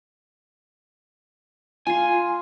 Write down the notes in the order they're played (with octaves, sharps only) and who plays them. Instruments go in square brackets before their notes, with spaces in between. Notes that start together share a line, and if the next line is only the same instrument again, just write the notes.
[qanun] F4 C6 [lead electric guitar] G#5